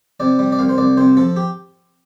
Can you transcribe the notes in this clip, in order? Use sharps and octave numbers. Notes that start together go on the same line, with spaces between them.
C3 D5
G3
D5
C2 F5
C5
C2 D5
C3 C5
F3 A4
G4